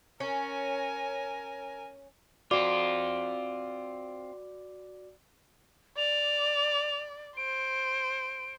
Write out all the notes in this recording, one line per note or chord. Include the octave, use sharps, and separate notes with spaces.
C#4 A#4 G#5
C4 F4 F#4 D5 D6
D5 F7
C5 D7